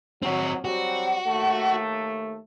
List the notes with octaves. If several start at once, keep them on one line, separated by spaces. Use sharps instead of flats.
F#3 C4 F#4
F#3 G3 C4 F#4
D#2 A3